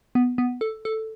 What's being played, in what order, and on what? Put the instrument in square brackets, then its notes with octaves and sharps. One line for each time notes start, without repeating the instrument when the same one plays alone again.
[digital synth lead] B3
B3
A4
A4